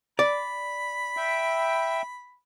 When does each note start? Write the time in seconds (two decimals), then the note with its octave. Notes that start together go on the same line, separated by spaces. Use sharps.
0.19 D5 B5
1.17 E5 G5